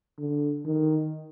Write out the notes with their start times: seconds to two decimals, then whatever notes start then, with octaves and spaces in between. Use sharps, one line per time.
0.18 D3
0.65 D#3